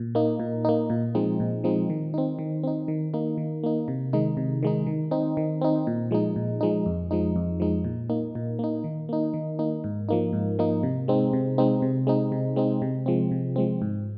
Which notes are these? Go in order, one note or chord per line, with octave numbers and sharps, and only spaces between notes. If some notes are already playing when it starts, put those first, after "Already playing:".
Already playing: A#2
A#3 D#4
A#2
A#3 D#4
A#2
F3 G#3 C4 D#4
A#2
F3 G#3 C4 D#4
D#3
C4 D#4
D#3
C4 D#4
D#3
A#3 D#4
D#3
A#3 D#4
C3
D#3 G#3 D#4
C3
D#3 G#3 D#4
D#3
C4 D#4
D#3
C4 D#4
A#2
F3 G#3 D#4
A#2
F3 G#3 D#4
F2
F3 G#3 D#4
F2
F3 G#3 D#4
A#2
A#3 D#4
A#2
A#3 D#4
D#3
A#3 D#4
D#3
A#3 D#4
G#2
F3 A#3 D#4
G#2
F3 A#3 D#4
C3
G#3 C4 D#4
C3
G#3 C4 D#4
C3
G#3 C4 D#4
C3
G#3 C4 D#4
C3
F3 G#3 C4
C3
F3 G#3 C4
G#2